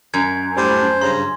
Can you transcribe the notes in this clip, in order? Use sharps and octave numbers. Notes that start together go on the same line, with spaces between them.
F#2 G#6
A2 G3 D4 C5
G2 C#3 A#5 C6